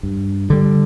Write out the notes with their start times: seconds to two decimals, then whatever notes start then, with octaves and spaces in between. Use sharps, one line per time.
0.03 G2
0.50 D3 G3